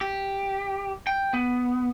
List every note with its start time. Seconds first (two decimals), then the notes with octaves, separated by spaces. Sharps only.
0.01 G4
1.07 G5
1.34 B3